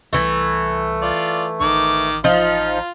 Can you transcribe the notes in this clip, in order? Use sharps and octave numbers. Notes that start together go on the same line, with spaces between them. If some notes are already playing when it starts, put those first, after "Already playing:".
C2 E3 A3
F4 D5
A1 D#3 D6
F3 D#4 F4